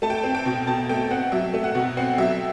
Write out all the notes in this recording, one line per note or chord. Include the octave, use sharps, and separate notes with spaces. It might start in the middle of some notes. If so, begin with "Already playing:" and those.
A3 A5
G5
A5
C4
G5
B2
B2 A5
A3 G5
C4 F#5
F#3 E5
A3
F#5
B2
C4 F#5
F#3 E5